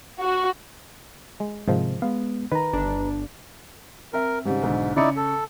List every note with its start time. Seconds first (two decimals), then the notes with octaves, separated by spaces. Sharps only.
0.21 F#4
1.40 G#3
1.68 G#2 C3 D#3 F3
2.02 G#3 B3 F5
2.52 D#3 B4 A#5
2.73 G1 D4
4.13 C4 A#4 E5
4.45 G#2 C#3 G3
4.63 B1 D3
4.97 C#3 D#4 E4 D5 C#7
5.16 A4